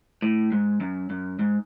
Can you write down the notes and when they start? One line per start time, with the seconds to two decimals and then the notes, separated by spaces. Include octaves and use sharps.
0.22 A2
0.52 G#2
0.80 F#2
1.10 F#2
1.39 G#2